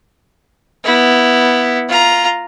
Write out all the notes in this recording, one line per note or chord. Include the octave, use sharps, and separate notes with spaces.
B3 E4
F4 A#5